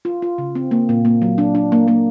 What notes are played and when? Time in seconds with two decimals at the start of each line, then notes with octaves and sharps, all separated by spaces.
0.05 F4
0.22 F4
0.38 C#3
0.55 C4
0.71 A#3
0.89 A#2
1.05 A#3
1.22 F#3
1.38 D4
1.55 D4
1.72 A#3
1.88 A#3